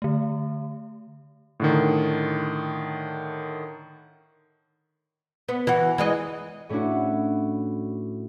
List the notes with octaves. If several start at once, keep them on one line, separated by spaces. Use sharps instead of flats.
D3 A3
A2 D3 D#3
B3
E3 F#4
E3 G#3 D#5
A2 A3 C#4 D4 E4 F#4